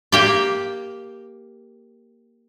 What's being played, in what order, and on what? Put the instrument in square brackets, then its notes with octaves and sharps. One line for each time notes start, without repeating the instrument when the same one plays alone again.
[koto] A#3 G4 D5